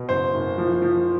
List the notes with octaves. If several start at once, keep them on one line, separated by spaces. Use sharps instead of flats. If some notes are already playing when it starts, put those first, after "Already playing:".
Already playing: B2
F#1 C5
F#1
F3
F3